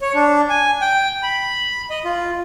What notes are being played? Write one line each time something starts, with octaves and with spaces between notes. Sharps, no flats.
C#5
D4
G#5
G5
B5
D#5
F4